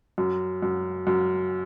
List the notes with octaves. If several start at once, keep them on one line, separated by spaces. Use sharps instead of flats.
F#2
F#2
F#2